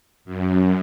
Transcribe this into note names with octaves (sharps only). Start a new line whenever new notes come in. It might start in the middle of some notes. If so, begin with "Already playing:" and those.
F#2